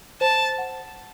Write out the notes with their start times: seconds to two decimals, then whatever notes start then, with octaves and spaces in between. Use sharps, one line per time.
0.21 C5 A5
0.58 F#5